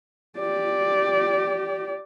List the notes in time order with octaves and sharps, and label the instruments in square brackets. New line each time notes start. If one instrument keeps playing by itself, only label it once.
[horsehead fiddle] G4 D5